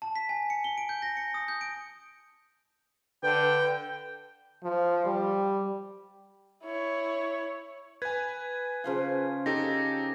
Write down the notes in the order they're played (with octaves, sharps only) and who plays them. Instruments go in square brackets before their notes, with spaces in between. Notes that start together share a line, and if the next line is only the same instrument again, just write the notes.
[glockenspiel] A5
B6
G#5
C#7
G7
D7
G6
A#6
C#7
D#6
G6
D7
[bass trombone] D3 [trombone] B4 [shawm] G5
[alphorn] F3
G3
[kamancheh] E4 C#5
[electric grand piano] B4 G#5 [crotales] G#6
[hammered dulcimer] C#3 F3 F5
[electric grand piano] D#4 G4 A4 [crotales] A#6